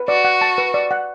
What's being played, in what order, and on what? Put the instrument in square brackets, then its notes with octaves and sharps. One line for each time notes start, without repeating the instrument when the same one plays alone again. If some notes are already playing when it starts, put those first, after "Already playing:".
Already playing: [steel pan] B4
[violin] F#4 [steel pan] D5
[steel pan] F#5
A5
B4
D5
F#5